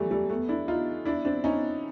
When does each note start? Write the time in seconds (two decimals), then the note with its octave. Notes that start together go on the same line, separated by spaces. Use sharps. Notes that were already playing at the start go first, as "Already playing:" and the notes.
Already playing: E3 F#3 G3 A3
0.11 G3 A3
0.29 A3 B3
0.49 D4 E4
0.68 D#4 F4
1.05 D4 E4
1.25 C4 D4
1.44 C#4 D#4